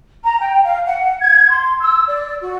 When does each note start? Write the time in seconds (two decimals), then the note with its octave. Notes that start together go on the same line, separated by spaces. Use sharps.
0.24 A#5
0.39 G5
0.63 F5
0.86 F#5
1.20 G#6
1.50 C6
1.81 E6
2.08 D5
2.42 F#4